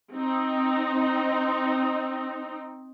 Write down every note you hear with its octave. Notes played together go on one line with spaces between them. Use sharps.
C4 D#4